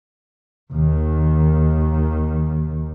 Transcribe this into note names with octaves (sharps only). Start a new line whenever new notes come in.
D#2 D#3